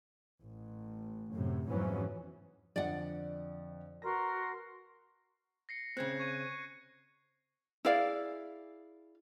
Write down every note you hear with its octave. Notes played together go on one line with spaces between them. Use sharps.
A1
F#2 A2 C3
F2 G#2 E3 F#3 B3 C#4
F2 D3 D5 D#5 F#5
F#4 A#4 B4 C6 A#6
A#6 C7 C#7
C#3 C4 F#6 G#6 C#7
C#6 G#6 D#7
E4 G#4 D5 F5